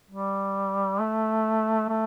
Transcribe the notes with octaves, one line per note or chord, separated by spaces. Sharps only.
G3
A3
A3